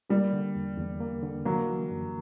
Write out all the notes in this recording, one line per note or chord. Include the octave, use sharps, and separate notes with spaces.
G3 A#3
D3
E2
E2
A#3
D3
F#3 A#3
E3
F#2